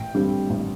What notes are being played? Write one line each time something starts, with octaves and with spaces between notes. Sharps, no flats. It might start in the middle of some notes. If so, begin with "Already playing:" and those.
Already playing: A1 G5
G2 D3 G3 C4
A1